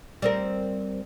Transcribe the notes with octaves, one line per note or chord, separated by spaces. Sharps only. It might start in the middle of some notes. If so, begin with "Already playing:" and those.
G3 C4 A#4